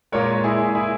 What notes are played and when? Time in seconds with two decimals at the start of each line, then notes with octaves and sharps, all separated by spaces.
0.12 A#2 G#3 A#4 C#5
0.44 E4 G#4
0.75 E4 G#4